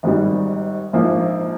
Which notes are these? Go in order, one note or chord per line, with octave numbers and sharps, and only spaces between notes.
G#1 G#2 G3
A#1 G#2 F3 A#3